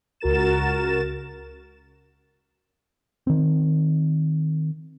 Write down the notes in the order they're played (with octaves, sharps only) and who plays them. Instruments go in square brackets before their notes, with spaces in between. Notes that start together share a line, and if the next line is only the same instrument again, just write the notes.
[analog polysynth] C#2 F#4 A#4 A6 E7
[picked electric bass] D#3 C4